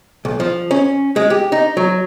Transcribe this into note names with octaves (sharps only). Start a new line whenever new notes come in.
B1
F3
C#4
G#3
G4
D#4
F#3